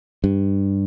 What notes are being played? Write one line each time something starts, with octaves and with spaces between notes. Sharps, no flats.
G2